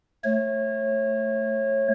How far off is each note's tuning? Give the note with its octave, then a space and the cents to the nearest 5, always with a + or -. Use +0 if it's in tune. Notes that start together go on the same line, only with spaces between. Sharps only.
A3 +0 C#5 -30